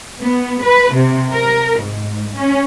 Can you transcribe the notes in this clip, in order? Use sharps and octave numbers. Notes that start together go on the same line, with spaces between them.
B3
B4
C3
A#4
G#2
C#4